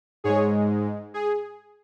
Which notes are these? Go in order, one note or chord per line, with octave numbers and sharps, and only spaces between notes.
G#2 G#3 G#4 C#5
G#4